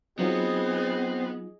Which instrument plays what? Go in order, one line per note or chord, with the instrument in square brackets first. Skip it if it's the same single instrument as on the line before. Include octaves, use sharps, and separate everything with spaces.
[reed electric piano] F#3 D#4 F4 [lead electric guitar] B3 [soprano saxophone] C4 [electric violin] G#4 D#5